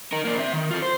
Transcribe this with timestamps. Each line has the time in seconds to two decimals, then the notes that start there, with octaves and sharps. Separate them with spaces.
0.12 D#4 A#4
0.25 A#3 D4
0.39 C4 E5
0.53 D#3
0.71 F4 A4
0.82 C5